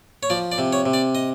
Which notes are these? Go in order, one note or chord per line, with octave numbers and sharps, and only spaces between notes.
C#5
F3 D5
D5
C3
C#5
C3
D5
D#5